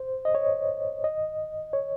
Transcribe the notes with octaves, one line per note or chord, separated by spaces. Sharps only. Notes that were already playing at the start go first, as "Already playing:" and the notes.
Already playing: C5
D#5
C#5
D#5
C#5